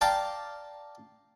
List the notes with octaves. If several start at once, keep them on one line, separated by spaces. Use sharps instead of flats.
D5 F5 G5 A5 A#5 D6